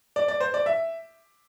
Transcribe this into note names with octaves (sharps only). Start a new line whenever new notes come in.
D5
D5
C5
D5
E5